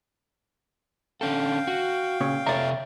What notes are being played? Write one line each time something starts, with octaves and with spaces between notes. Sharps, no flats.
D3 C#4 A4 F5 G5
F#4
A#2 C#3 C#5
C3 A4 C#5 D5 E5 A#5